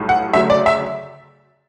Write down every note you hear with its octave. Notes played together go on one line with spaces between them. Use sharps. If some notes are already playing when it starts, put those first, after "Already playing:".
Already playing: B1 A2 G3
F#5
D2 C#3 F#3 A3 E5
D5
E5